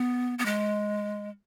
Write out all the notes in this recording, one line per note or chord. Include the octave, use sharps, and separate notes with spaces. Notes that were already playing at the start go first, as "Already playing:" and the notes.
Already playing: B3
B3
G#3